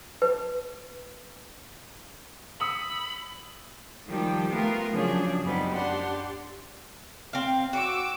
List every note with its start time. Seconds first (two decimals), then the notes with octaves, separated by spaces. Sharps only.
0.22 B4
2.60 B5 D#6 E6 C#7
4.07 D#3 F3 G3 G4
4.51 A3 B3 F4 A#4
4.92 C#3 F3 F#3 C#4 D4 G#4
5.43 F#2 G3 B3 C4 D#4
5.73 D4 G4 F#5 C6
7.33 C4 F5
7.73 F#4 D6 E6